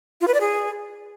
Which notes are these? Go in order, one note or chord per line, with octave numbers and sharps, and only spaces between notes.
F4
B4
D5
G#4